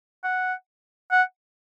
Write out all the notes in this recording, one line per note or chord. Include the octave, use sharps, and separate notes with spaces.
F#5
F#5